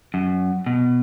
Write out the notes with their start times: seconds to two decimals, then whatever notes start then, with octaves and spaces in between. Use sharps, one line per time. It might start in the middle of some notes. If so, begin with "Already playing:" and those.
0.14 F#2
0.66 B2